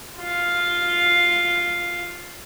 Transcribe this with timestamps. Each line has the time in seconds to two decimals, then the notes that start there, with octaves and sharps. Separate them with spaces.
0.18 F4 F5